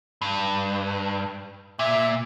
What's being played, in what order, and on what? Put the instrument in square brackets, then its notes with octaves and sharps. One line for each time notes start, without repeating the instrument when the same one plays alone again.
[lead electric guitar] G2
[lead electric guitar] A#2 [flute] E5